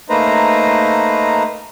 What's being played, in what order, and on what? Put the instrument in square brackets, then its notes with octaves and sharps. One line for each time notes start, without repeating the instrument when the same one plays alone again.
[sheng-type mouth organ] A3 A#3 D#4 B4 C5 A#5